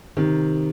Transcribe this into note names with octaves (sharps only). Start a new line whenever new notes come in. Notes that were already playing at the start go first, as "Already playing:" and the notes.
C3 D#3